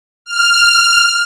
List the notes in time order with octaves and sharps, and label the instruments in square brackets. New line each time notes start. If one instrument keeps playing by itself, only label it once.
[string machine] F6